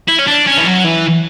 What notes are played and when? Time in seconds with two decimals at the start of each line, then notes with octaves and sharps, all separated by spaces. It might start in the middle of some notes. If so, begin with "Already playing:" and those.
0.08 E4
0.19 C#4
0.28 D4
0.47 C#4
0.58 E3
0.66 F#3
0.85 E3